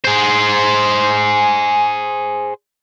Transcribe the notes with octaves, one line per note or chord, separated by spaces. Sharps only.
G#4 C5